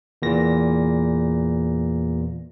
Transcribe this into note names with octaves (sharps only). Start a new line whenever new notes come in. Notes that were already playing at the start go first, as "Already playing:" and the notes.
E2 A#2 A#6